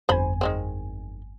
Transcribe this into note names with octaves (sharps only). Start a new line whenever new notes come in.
G1 F2 C5 G#5 B5
D#3 G#3 C4